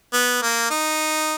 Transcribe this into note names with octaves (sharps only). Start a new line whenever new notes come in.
B3
A#3
D#4